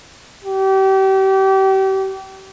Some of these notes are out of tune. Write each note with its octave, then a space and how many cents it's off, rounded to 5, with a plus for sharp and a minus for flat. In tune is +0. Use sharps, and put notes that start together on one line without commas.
G4 -35